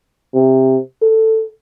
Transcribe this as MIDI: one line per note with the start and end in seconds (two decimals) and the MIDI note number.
0.35 0.78 48
1.02 1.46 69